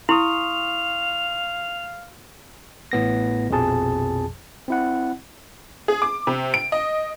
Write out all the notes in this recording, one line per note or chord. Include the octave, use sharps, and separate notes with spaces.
E4 F5 C6 C#6 D#6 F7
A1 A2 B3 A#6
A#1 F2 B2 F3 G#4 A5
C4 E4 F#5
G#4
D6
C3
D7
D#5